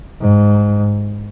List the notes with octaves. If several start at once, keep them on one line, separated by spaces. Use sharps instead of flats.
G#2